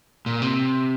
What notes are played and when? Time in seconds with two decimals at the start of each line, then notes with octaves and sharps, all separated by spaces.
0.26 A#2
0.42 C3